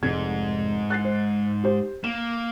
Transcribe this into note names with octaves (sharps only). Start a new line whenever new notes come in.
F1 G#2 G#3 G#6
F#6 A6 C7
C5
G4 C5
A#3 E7